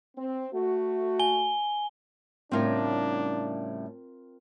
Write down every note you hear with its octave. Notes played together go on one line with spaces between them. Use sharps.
C4
A3 F#4
G#5 G7
A2 C#3 G3 C4 D4 F4 A#4